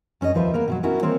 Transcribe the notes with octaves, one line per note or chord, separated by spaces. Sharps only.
F#2 C#4 G#4 D#5
D#2 F3 B4 C5 E5
A#3 B3 A#4
B2 F3 F#3
B3 C#4 E4 F#4 A#4
D#3 E3 A#3 C4 C#5